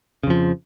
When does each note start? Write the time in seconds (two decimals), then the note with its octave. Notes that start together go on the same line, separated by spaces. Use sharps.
0.23 C#3
0.27 F2
0.30 F3